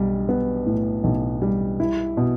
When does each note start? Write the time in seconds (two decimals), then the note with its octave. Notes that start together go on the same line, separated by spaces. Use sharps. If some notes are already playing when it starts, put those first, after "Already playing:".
Already playing: B1 G3
0.29 B3
0.66 A2
1.04 B1
1.42 G3
1.80 E4
2.17 B2